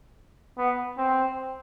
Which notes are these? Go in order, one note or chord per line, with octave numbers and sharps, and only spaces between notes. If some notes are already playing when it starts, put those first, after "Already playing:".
B3
C4